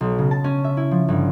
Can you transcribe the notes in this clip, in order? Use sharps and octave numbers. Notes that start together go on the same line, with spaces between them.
B1
C#3
A5
C#4
E5
E4
F3
G1